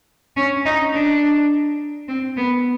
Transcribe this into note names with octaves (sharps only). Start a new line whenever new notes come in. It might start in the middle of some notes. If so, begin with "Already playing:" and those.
C#4
D#4
D4
C4
B3